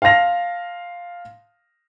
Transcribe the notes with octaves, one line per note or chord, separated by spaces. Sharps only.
F5 A5 C6 A#6 F7